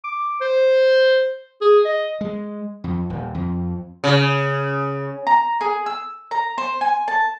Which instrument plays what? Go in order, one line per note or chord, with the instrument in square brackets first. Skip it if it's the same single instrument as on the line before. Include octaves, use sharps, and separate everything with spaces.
[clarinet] D6
C5
G#4
D#5
[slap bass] G#3
F2
D#1
F2
[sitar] C#3
[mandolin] A#5
G#4
E6
A#5
C5
G#5
A5